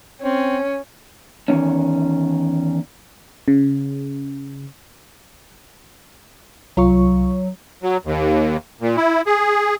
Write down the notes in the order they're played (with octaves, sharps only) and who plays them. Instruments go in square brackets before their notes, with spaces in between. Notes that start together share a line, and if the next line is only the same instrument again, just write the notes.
[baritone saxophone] C4 [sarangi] C#4
[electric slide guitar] E2 D#3 C#4
[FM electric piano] C#3
[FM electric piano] C2 F4 C#6 [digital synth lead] F#3
[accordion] F#3
D#2
A#2
E4
G#4